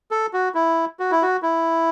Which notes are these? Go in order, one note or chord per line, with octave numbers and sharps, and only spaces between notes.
A4
F#4
E4
F#4
E4
F#4
E4